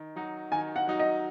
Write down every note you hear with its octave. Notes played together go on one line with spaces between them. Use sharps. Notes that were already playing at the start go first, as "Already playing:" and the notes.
Already playing: D#3
F#3 D#4 F#4
D#3 G#5
F#5
F#3 D#4 F#4
D#5